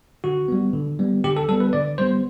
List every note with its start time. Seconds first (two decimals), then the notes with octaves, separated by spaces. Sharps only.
0.24 D3 F#4
0.48 G3 B3
0.73 D3
0.99 G3 B3
1.24 D3 G4
1.36 A4
1.48 G3 A4
1.52 B3
1.60 B4
1.73 D3 D5
1.98 G3 B3 C5